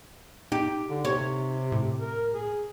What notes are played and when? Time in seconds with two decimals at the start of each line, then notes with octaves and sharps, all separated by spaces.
0.52 D#4 G4
0.89 D3
1.05 C3 C#5
1.72 A2
2.00 A#4
2.33 G#4